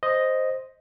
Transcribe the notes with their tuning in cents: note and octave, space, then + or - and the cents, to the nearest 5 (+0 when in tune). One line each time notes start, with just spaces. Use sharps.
C5 +0 D#5 +0